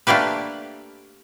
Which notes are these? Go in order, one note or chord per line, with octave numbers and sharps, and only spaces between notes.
A3 A#3 D4 G4 B4